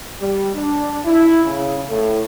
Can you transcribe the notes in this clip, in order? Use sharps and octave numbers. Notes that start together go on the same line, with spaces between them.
G3
D4
E4
C#3
A2